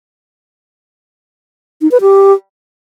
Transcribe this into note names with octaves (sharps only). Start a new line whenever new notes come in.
D#4
B4
G4